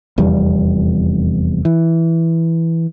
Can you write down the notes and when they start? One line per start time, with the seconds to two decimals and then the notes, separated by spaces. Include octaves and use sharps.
0.18 F1 E2 G3
1.65 E3